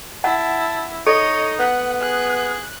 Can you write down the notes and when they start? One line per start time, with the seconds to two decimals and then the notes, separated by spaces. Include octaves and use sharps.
0.24 E4 F#5 A5
1.07 D#4 A4 C#5 D#5
1.59 B3 F#5
2.02 G#4 F#6